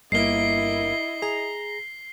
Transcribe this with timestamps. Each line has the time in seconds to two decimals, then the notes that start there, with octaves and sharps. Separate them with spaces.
0.12 G1 G2 A#3 E4 D#5 C7 D7 G7
1.22 G#4 A#5